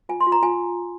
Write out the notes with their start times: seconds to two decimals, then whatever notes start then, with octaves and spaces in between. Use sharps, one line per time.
0.09 F4 G#5
0.20 C6
0.27 F4
0.32 A#5
0.42 F4 G#5